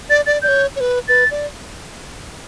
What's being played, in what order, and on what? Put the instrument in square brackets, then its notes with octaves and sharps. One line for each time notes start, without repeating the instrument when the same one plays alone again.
[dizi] D5 [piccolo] A6
[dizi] D5 [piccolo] A6
[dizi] D5 [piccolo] G6
[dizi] C#5
C#5
B4
[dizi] B4 [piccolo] A6
[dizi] D5